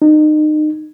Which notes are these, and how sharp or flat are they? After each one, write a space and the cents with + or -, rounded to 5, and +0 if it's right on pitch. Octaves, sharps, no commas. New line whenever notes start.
D#4 -30